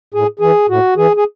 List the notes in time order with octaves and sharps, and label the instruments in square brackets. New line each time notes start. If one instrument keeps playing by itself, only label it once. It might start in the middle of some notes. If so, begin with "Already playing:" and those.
[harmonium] A2 G#4
E3 G#4
A2 F#4
E3 G#4
G#4